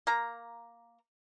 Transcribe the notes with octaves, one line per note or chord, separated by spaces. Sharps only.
A#3 A#5